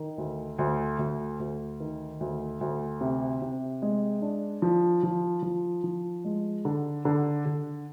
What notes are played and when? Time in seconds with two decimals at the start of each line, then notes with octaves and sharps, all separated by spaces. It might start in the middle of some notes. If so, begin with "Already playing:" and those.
Already playing: D#3
0.18 D2
0.59 D2
0.99 D2
1.40 D2
1.80 D#3
2.20 D2
2.61 D2
3.01 C3
3.42 C3
3.82 G#3
4.22 D4
4.62 F3
5.03 F3
5.43 F3
5.84 F3
6.25 G#3
6.65 D3
7.05 D3
7.46 D3